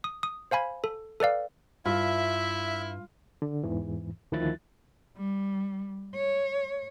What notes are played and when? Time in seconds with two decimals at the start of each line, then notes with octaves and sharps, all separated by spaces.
0.04 D#6
0.23 D#6
0.51 C5 F5 G#5 B5 G#6
0.84 A4
1.20 A4 B4 D5 F5
1.85 G2 E4 F4 E5
3.42 D3
3.64 E2 G#2 E3
4.32 D2 D#3 F3 E4 F#6 A6
5.17 G3
6.15 C#5